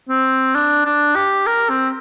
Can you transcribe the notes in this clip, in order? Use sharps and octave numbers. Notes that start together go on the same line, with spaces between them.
C4
D4
D4
G4
A#4
C4